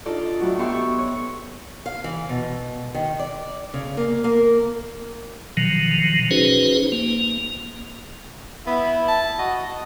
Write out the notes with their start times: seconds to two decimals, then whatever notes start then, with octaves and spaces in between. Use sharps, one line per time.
0.06 D4 D#4 F4 A4 D5
0.40 A2 F#3 F#4
0.58 B3 G4 E5 C6 C#6
0.99 C#5
1.86 F5
2.04 E3
2.29 B2
2.95 D#3
3.19 D5
3.74 C#3
3.97 A#3
4.24 A#3
5.57 B2 D#3 F3 F#3
6.31 C#4 D#4 F#4 G#4 B4 C5
6.92 A#3
8.67 B3 E4
9.08 A5
9.39 F#4 D#5